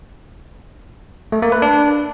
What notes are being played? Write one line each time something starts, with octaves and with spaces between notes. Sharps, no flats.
A3
A#3
B4
D4